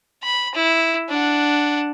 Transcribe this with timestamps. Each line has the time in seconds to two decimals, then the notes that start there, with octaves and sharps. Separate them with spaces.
0.23 B5
0.55 E4
1.09 D4 F#5